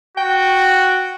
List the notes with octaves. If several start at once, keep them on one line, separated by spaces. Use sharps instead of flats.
F#4 G5